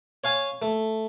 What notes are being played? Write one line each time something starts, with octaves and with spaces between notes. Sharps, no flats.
C#5 F5 G#5
A3